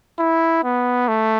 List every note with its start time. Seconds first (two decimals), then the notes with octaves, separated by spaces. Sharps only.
0.19 E4
0.64 B3
1.08 A3